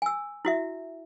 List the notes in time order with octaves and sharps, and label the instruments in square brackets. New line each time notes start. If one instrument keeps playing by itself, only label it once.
[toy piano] G#5 E6
E4 F#4 E5